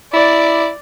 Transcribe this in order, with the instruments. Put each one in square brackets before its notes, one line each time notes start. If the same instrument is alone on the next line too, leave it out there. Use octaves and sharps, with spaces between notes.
[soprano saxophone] E4 [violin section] D5